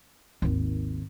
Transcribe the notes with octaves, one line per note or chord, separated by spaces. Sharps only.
G#1 D#2